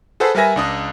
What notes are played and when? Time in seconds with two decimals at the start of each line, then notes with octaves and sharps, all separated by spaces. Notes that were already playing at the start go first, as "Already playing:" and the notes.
0.20 G#4 A4 B4 C5 F#5 A5
0.35 G3 A#4 B4 E5 G#5 A#6
0.56 C#2 D4 D#6